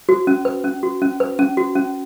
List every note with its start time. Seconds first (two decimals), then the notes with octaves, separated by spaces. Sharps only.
0.09 F#4
0.27 C#4
0.45 B4
0.64 C#4
0.83 F#4
1.02 C#4
1.20 B4
1.39 C#4
1.57 F#4
1.75 C#4